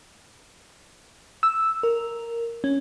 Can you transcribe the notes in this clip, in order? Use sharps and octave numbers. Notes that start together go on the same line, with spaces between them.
E6
A#4
C#4